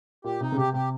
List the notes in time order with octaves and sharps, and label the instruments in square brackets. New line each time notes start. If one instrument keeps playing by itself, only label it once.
[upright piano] A#2 [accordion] G4
[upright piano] C3 [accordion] D#4
[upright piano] C#3
[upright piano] C3 [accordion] G4
[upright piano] C3 [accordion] G4